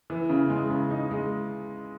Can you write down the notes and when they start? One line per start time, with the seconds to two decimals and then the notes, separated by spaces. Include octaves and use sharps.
0.10 E3
0.30 C#3
0.50 G#3
0.70 C#3
0.91 D#4
1.11 G#3